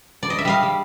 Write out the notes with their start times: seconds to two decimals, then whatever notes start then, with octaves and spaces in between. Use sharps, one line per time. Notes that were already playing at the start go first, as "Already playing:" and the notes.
0.23 D5
0.30 D#5
0.38 E5
0.45 G3 D#5 F5
0.63 G3